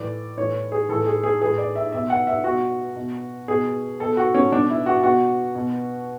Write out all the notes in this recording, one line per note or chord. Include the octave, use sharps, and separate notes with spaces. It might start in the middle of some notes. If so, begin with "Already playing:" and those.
Already playing: A2 E3 D5
A2 E3 C#5
G#4
A2 E3 A4
G#4
G#4
A2 E3 G#4
D5
E5
B2 E5
F#5
E5
B2 F#4
B2
B2 G#4
B2 A4
F#4
C#4
B2 D4
E4
F#4
B2 F#4
B2